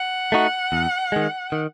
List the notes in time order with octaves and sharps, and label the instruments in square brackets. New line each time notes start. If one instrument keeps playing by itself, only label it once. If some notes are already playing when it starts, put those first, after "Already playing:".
Already playing: [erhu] F#5
[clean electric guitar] A3 D#4 F#4
E2
D#3 G#3
D#3